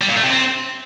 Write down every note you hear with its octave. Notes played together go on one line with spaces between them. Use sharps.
G3
A#2
A3
C3
C4